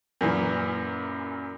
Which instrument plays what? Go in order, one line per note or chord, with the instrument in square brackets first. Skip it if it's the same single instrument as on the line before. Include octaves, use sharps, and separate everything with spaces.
[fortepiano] F#2 A#2 E3